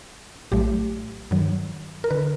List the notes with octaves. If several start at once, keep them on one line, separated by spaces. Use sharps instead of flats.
A#1 A2 F#3 A3 G4
G2 D#3 F#3
A#4
D3 B4